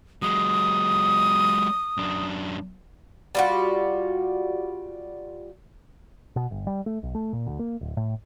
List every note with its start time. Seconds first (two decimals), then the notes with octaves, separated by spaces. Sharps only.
0.22 F#3 G#3 D#6
1.97 F#2 D4
3.35 G3 F4 F#4
6.36 B2
6.51 G1
6.67 G3
6.86 A3
7.03 B1
7.15 A3
7.33 A#2
7.47 D2
7.59 A#3
7.81 D1
7.97 A2